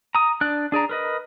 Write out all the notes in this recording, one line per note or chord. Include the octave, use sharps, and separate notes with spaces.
A#5 D#6
D4 D5 F#6
D4 G#4 D5 A#5
A#4 B4 D#5